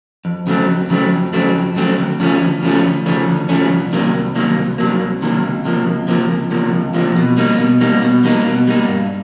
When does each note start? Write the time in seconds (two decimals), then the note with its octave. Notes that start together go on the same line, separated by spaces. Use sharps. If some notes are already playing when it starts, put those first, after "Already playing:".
0.25 F2
0.47 C#3 F#3 A3 C4
0.68 F2
0.90 C#3 F#3 A3 C4
1.12 F2
1.33 C#3 F#3 A3 C4
1.55 F2
1.76 C#3 F#3 A3 C4
1.99 D2
2.20 C#3 F3 A3 C#4
2.41 D2
2.63 C#3 F3 A3 C#4
2.85 D2
3.06 C#3 F3 A3 C#4
3.27 D2
3.49 C#3 F3 A3 C#4
3.70 C2
3.93 C3 D#3 F#3 A#3
4.13 C2
4.36 C3 D#3 F#3 A#3
4.58 C2
4.78 C3 D#3 F#3 A#3
5.01 C2
5.22 C3 D#3 F#3 A#3
5.43 C#2
5.65 C3 F3 A#3
5.87 C#2
6.08 C3 F3 A#3
6.30 C#2
6.51 C3 F3 A#3
6.73 C#2
6.94 C3 F3 A#3
7.16 B2
7.37 G3 A#3 D#4
7.59 B2
7.81 G3 A#3 D#4
8.02 B2
8.24 G3 A#3 D#4
8.46 B2
8.68 G3 A#3 D#4
8.88 G2